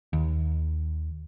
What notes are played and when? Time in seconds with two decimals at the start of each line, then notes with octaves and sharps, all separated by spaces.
0.13 D#2